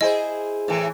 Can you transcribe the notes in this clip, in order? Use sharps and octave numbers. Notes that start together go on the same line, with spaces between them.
E4 G#4 C5 D#5
A2 E3